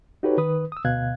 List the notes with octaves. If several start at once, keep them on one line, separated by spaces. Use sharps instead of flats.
D#4 F#4 G4 A4 B4 C#5
D#3 B4 D#6
D#6 E6
D2 B2 F5 F#6 G#6